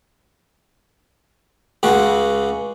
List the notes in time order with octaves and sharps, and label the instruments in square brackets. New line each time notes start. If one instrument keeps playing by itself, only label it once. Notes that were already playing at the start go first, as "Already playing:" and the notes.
[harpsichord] C#2 C#3 F#4